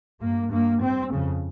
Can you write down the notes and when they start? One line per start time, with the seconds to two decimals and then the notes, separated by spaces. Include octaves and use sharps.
0.21 G2 A#3
0.51 G2 A#3
0.82 G2 C4
1.12 F2 C#3